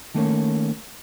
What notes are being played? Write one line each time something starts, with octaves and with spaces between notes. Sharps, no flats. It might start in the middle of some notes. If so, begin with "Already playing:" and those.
D#3 A3 A#3 C#4